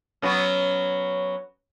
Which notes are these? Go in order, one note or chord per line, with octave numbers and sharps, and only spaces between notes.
F#3 B3 C#4